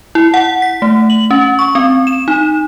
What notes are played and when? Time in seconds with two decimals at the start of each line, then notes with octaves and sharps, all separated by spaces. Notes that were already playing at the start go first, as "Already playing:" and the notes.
0.15 E4
0.34 F#5
0.62 B6
0.82 A3
1.10 F#7
1.31 C#4
1.59 C#6
1.75 C4
2.07 E7
2.28 D#4